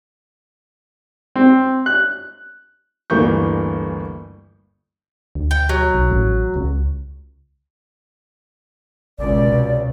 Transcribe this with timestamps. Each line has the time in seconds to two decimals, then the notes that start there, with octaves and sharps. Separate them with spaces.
1.36 C4
1.86 F#6
3.10 G1 D2 E3 A#3 C#6 G6
5.35 D2
5.51 G5
5.69 F#3
5.94 B1
6.11 A1
6.56 C#2
9.19 G#1 C#2 B2 D5
9.47 C3